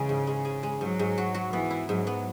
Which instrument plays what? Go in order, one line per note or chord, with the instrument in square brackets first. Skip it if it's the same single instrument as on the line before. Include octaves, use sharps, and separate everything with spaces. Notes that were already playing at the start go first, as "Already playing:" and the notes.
Already playing: [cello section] C#3 [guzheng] E3 G#3
[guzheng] G#2
G#3
G#4
G#3
[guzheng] G#2 [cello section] F#3
[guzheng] G#2
F#4
F#4
[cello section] E3 [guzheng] B3
[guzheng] E4
[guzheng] G#2 [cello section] F#3
[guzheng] B3